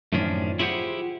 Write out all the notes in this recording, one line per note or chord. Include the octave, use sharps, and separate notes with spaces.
F#2 A2 D#3 F3 C#4 D4
E4 F4 G4 G#4 C5 F#5